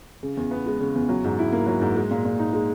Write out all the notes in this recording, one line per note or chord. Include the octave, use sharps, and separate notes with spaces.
C#3
E2
B3
G#3
C#3
E2
F#3
G#2
E4
A#3
F#3
G#2
G#3
A#2
A#2
D#4
G#3